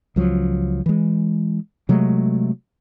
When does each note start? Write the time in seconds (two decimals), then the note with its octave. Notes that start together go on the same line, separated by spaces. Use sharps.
0.16 C#2 F3 F#3
0.86 E3 G#3
1.89 C3 F#3 G#3 A3